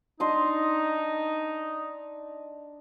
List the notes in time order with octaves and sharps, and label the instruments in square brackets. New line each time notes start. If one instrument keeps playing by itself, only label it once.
[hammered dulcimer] D4 D#5 C6 [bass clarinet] D#4